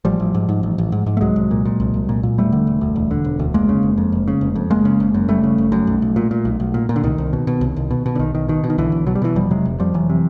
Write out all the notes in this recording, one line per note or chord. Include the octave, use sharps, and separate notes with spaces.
A1 F3 G3
A1
G#2
G#2
A1
A1
G#2
G#2
A3
C2 F#3 G#3
C2
A#2
A#2
C2
C2
A#2
A#2
E1 G3 A3
D3
E1
D2
E1
D3
E1
D2
F1 G#3 A#3
C#3
F1
F2
F1
C#3
F1
F2
F#1 G#3 A#3
C#3
F#1
F#2
F#1 G3 A3
C#3
F#1
F#2
B1
B1
A#2
A#2
B1
B1
A#2
A#2
D3
C2 D#3
C2
B2
B2
C2
C2
B2
B2
D3
B1 D#3
B1 D#3
B2 D#3
B2
D#3
B1 D3 E3
B1
B2 F#3
G3
B2 E3 F#3
F1 F3 G3
C3 F#3 G#3
F1
F2 F3 G3
F1 E3 F#3
C3